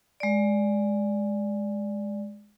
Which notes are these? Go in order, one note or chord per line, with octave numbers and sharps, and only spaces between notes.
G#3 D5